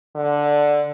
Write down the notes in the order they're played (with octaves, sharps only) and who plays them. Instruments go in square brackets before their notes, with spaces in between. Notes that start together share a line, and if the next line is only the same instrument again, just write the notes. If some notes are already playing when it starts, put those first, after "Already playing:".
[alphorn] D3